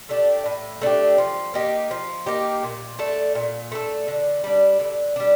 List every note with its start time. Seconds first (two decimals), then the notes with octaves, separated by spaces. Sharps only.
0.09 A3 D4 G4
0.46 A2
0.81 A3 D4 G4
1.18 F3
1.54 A#3 D#4 G4
1.91 F3
2.26 A#3 D#4 G4
2.63 A#2
2.99 A3 D4 A4
3.35 A#2
3.72 A3 D4 A4
4.08 D3
4.44 G3 D4
4.80 D3
5.16 G3 D4